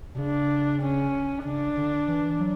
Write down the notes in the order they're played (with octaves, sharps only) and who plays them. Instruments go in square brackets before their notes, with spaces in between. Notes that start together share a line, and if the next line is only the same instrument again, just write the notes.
[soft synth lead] B2
[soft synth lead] C#3 [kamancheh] D4
[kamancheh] C#4
[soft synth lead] C#3 [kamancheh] D4
[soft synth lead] D3
E3
F#3